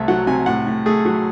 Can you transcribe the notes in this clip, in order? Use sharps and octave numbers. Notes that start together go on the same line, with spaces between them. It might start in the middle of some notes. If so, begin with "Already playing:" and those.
Already playing: C2 A3 E5
F#3 F#5
C3 G#5
A2 F#5
A2
A3 G#4
F#3